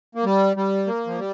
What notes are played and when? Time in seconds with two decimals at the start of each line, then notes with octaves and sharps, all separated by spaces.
0.15 A#3
0.24 G3
0.57 G3
0.87 A#3
1.07 F3
1.18 G3